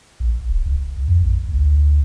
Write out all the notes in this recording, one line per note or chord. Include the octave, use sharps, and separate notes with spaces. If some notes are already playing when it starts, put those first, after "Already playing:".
A#1
D1
C#2
F2
A#1
D2